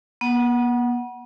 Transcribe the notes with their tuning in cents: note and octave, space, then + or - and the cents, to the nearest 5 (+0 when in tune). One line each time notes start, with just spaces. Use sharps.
B3 -45 F#5 +5